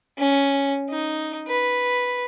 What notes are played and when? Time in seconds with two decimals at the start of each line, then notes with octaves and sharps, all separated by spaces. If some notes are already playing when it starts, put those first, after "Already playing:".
0.18 C#4
0.89 D#4
1.47 B4